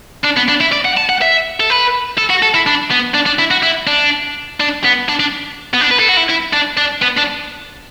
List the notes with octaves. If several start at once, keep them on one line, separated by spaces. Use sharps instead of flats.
D4
B3
D4
E4
D5
F#5
A5
F#5
E5
A4
B4
A4
F#4
A4
E4
D4
B3
D4
D4
E4
F#4
E4
D4
D4
B3
D4
D4
B3
D4
B4
A4
F#4
E4
E4
D4
D4
B3
D4